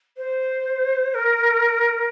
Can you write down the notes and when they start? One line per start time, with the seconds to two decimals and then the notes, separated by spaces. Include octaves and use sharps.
0.17 C5
1.10 C5
1.14 A#4